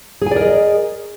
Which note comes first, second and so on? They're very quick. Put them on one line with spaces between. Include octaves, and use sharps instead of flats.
G#4 G#5 D5 A#4 D#5